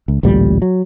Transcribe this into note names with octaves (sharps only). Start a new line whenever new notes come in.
C#2
A1 D2 A#2 G3
F#3